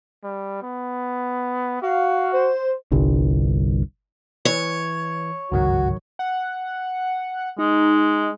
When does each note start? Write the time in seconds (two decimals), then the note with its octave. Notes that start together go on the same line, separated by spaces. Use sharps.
0.23 G3
0.62 B3
1.82 F#4 F5
2.32 C5
2.91 G1 C2 G2
4.45 E3 C#5
5.52 G1 C#2 G#2 D#3 F#3 F#4
6.19 F#5
7.59 G#3 D#4